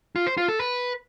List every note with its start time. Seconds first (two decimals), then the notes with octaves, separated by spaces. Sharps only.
0.16 F4
0.27 C5
0.37 F4
0.48 A4
0.59 B4